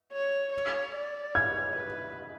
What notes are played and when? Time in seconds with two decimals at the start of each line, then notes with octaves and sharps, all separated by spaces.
0.13 C#5
0.53 C#5
0.95 D5
1.35 C#5 G#6
1.76 B4